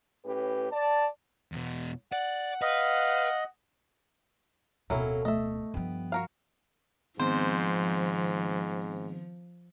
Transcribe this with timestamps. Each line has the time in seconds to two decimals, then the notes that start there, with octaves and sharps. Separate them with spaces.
0.25 A2 C#4 G4 B4
0.71 D5 A5
1.52 E2 B2
2.12 D5 F#5
2.62 B4 D#5 F5
4.90 D1 B2 F#3 C#4 E4 A4 A#4 F5
5.25 A3 D#5 E5
5.74 G2 F3 B3 G5
6.12 F#4 A#4 F5
7.19 G#2 D#3 F3 B3 C4 C5